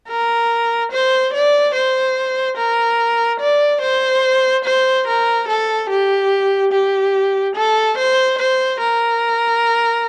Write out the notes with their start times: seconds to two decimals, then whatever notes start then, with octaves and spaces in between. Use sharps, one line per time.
0.08 A#4
0.92 C5
1.33 D5
1.74 C5
2.57 A#4
3.40 D5
3.81 C5
4.64 C5
5.07 A#4
5.48 A4
5.89 G4
6.72 G4
7.56 A4
7.98 C5
8.38 C5
8.80 A#4